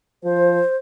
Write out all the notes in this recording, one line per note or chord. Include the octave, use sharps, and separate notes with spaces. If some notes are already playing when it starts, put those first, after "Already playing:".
F3 C5